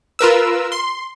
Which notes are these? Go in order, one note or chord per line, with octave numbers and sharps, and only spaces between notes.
F4 A#4 B4 E6
C6